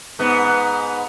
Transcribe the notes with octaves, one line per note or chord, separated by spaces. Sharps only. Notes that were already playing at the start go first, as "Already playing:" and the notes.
G#2 B3